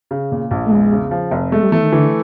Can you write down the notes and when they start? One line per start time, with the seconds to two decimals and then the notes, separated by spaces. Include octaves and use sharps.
0.11 C#3
0.32 A#2
0.51 A#1
0.65 A3
0.71 E2 G#3
0.92 C#3
1.11 F3
1.31 F1
1.52 G#3 A3
1.62 G3
1.72 E3 A3
1.82 D#3
1.92 D3 E3